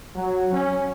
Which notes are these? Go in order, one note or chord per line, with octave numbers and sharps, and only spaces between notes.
F#3
C#4